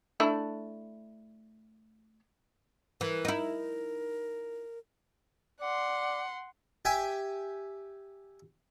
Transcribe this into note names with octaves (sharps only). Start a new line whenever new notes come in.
A3 D4 E4
E3 A#4
D#4 E4
D5 F#5 C6
G4 E5 G5 G#5